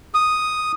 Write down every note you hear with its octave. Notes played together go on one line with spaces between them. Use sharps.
D#6